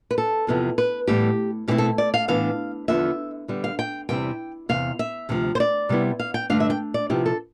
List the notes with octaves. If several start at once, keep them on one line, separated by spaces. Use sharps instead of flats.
B4
A4
E2 C3 F3 B3 E4
B4
A2 E3 G3 B3 G4
B2 A3 C4 E4 G4
A4
D5
F5
A2 E3 B3 D4 F5
E2 D3 F3 B3 E5
D3 G3 B3
F5
G5
E2 C3 G3 C4 E4 G5
E2 C3 F5
E5
D2 C3 F3
C5
D5
C3 G3 B3 E4
F5
G5
G2 D3 A3 D4 F5
E5
G5
D5
C3 F3 B3 E4 G4
A4